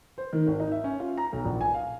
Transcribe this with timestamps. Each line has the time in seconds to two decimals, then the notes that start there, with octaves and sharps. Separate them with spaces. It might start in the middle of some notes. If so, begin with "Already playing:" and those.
0.18 C5
0.33 D#3
0.47 G#1
0.60 D#4
0.72 E5
0.84 C#4
1.00 F4
1.18 A#5
1.32 B1
1.45 A#1
1.61 G#5
1.74 F5